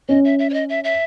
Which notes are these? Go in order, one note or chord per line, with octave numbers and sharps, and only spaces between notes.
C#4 D#5
E5
E5
C#5
D#5
E5
E5